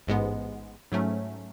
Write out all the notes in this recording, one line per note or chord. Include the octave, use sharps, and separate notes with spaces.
A1 G#2 G#3 B3
G#2 F#3 A3 C#4